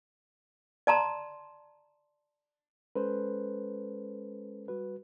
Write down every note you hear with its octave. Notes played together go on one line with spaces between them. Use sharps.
D5 A5 A#5 C6
G#3 C#4 A4 B4 C5
G3 F#4 B4